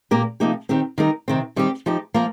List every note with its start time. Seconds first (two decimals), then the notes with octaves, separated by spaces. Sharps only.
0.11 A#2 A#3 G4 A#4
0.40 C3 F3 A#3 D#4 G4
0.69 D#3 C4 G4 A#4
0.98 D#3 G3 D#4 A#4
1.28 C3 D#3 C4
1.56 D#3 G3 C4 G4
1.86 F3 D#4 G4
2.14 F3 A#3 F4 A#4